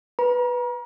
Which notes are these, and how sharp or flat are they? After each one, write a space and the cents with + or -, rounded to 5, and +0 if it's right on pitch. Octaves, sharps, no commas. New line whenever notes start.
B4 +0 A#5 +40